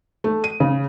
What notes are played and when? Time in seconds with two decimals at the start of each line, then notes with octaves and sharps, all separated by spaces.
0.24 A3
0.44 D#7
0.60 C#3